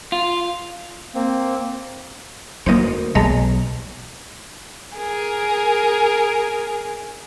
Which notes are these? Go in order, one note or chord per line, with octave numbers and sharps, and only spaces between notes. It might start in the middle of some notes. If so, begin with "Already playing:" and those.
F4
A#3 C4
D2 F#3 A#3 C5 D#5
B1 G#3 A5 A#5
G#4 A#4